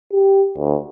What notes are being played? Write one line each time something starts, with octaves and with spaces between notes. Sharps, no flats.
G4
D2